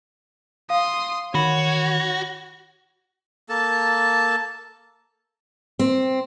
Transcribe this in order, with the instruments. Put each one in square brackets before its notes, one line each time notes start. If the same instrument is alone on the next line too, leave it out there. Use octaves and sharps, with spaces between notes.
[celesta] F5 [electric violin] C6 D#6
[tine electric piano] D#3 [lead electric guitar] F#4 [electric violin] C#5 [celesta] B5
[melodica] A#3 A4 A5
[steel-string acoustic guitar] C4